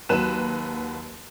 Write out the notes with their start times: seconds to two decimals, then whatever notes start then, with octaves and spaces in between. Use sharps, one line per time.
0.09 D#2 F#3 B4 F#6 E7